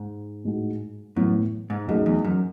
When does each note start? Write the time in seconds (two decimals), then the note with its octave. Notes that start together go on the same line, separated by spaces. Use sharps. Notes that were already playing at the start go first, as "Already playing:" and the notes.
Already playing: G#2
0.44 A2 G#3 D#4 F#4
1.16 F#2 A2 E3 B3
1.70 G#2
1.88 F#2 F#3 A3 D#4 G#4 D#5
2.06 E2
2.24 F#2